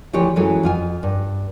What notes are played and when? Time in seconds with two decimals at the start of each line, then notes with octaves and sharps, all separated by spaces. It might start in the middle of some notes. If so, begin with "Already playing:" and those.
0.13 D2 E3 F3 G4 C#5
0.36 F#2 E3 F#3 G#3 A4 G#5
0.63 F2 F4 G#5
1.03 G2